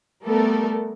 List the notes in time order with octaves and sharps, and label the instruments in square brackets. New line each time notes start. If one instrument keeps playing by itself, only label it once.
[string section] G3 A3 B3 A4 A#4